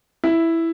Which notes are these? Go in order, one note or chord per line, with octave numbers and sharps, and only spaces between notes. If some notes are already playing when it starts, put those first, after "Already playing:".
E4